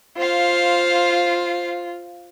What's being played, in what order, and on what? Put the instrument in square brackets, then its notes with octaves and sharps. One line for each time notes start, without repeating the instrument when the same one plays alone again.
[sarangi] F4 [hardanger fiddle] C5 F5